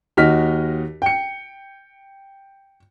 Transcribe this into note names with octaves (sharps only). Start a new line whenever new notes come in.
D#2 D#4 F#4 D#5 F6 B6
G5 C#7